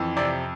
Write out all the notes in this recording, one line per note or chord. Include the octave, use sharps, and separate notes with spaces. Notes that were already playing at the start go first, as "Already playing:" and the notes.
Already playing: F2 E3
C3 D5